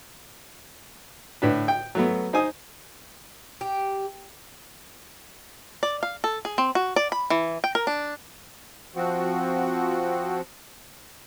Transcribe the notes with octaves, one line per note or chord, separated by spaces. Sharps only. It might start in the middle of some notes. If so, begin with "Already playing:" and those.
A2 D3 D4 B4
G5
F#3 A3 B3
D#4 C5 G#5 D#6
G4
D5
F5
A4
G#4
C4
F#4
D5
B5
E3
G5
A#4
D4
F3 C4 F#4